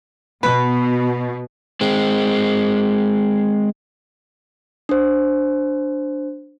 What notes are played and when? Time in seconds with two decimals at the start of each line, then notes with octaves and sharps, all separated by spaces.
0.43 B2 B4
1.81 G#3 C4
4.89 D4 C5